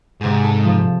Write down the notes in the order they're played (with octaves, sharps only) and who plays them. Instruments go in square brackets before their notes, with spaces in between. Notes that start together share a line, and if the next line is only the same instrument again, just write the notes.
[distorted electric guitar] G#2 [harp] C3 G#4
[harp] A4 A5
F3